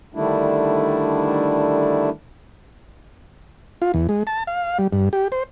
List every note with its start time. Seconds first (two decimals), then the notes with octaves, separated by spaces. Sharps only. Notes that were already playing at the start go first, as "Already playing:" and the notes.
0.14 D3 D#3 G3 A3 D4 E4
3.82 F4
3.94 E2
4.09 G#3
4.27 A5
4.47 F5
4.79 G3
4.93 G2
5.13 G4
5.32 C5